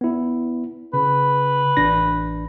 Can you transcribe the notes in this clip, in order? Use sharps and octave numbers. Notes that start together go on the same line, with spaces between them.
B3 E4
C#3 B4
A1 D4 A#6